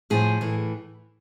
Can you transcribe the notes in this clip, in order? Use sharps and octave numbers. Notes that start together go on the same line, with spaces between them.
A2 F3 G#4
A2 E3